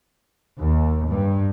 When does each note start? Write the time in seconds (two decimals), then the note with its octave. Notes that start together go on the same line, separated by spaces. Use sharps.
0.60 D#2
1.09 G2